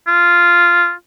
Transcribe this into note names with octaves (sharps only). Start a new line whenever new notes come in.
F4